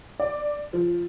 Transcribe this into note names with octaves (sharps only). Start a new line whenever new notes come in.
D5
F3